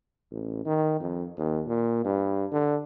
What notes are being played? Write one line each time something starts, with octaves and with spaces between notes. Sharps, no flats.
A1
D#3
F2
D#2
A#2
G2
D3